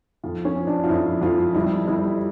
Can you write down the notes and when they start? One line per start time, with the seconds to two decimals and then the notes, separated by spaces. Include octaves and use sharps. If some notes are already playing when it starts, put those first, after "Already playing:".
0.24 F2 F4
0.45 C#4
0.56 F3
0.67 D4
0.84 F4
0.89 F2 E4
1.22 F2 F4
1.54 G3 E4
1.88 G3 E4